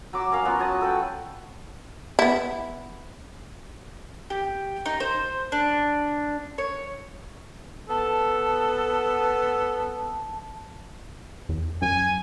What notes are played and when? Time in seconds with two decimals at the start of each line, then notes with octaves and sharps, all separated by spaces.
0.13 F#3 D6 E6
0.32 C#4 A#4 F5
0.45 F#3 B3 F4 F#4
0.59 C#5 A5 D#6
0.81 A4 B4 G5
2.19 B3 E4
4.30 G4
4.86 D#4
5.00 C5
5.52 D4
6.58 C#5
7.89 B3 A4 A5
11.49 E2
11.82 F#2 G#5